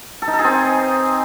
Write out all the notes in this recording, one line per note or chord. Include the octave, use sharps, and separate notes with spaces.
A4
D#4
A4
G#4
C4